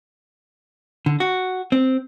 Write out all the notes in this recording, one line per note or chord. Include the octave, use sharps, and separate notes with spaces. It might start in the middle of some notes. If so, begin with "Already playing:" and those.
D3
F#4
C4